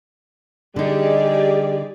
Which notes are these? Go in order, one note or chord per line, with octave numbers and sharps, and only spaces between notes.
D3 G3 D#4 G4 G#4 D5